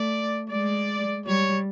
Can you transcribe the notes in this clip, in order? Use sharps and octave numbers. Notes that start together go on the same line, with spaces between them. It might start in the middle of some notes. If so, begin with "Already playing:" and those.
Already playing: A3 D5
G#3 D5
G3 C#5